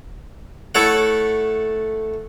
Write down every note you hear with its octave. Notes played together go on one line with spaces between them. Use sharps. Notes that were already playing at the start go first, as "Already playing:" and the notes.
A3 E4 A4 C#5 F#5